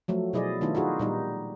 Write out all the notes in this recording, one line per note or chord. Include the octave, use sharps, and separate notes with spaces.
F3 F#3 A3
B2 F#3 E4 G#4 D5 D#5
D#3 A3 B3 D4 E4 F4
D#4 F4 F#4 G#4
A#2 G3 D#4